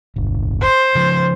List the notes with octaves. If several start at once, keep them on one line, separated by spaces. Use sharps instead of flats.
D1 G1
C5
C#3 F3